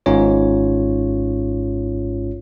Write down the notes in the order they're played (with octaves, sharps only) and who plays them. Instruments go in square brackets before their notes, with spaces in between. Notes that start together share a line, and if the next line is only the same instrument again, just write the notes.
[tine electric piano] G#1 G#2 C#4 F4 C#5